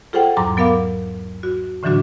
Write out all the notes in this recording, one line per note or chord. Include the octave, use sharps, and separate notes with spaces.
F4 G#4 A4 C5 F#5 G5
E2 G#2 F#3 A#5 D6
F#3 B3 A#4 F5 D6
F#4
A2 D3 E3 F#3 D4 F#4